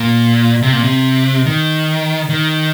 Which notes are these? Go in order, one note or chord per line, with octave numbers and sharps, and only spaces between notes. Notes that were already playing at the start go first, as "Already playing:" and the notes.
Already playing: A#2
C3
A#2
C3
D#3
D#3